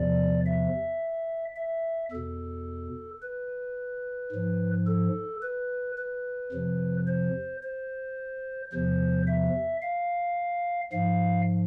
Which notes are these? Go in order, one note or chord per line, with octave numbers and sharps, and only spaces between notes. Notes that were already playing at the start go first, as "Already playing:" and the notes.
Already playing: E2 C3 F3 D5
E5
E5
E2 B2 A4
B4
G#2 F3
A4
B4
B4
F2 C3 F3
C5
C5
E2 C3 F3 C5
E5
F5
G#2 F3 F5